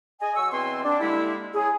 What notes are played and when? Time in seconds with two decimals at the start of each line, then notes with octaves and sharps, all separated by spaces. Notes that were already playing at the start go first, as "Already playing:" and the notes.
0.21 G#4 D#5 G#5
0.36 F#3 C#6 E6
0.52 E2 B2 C4 G#5 C6
0.84 D4
1.00 D3 G3 G#3 A#3 E4
1.54 C#4 E4 G#4